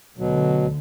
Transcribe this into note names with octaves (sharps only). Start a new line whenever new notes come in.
D2 B2 D3 F#3